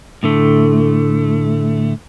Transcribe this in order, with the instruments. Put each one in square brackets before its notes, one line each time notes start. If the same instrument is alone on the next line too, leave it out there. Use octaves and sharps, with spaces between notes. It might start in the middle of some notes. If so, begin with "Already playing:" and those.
[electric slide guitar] A2 D3 A3